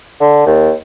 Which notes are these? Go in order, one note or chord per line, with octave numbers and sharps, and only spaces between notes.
D3
D#2